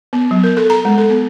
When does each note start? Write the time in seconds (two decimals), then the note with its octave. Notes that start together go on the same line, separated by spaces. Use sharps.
0.13 B3
0.31 F#3
0.44 A#4
0.57 A4
0.70 A#5
0.85 G#3
0.98 A4
1.10 B3